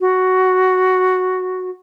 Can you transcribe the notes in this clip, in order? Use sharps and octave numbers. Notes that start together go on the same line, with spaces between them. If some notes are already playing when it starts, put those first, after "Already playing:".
F#4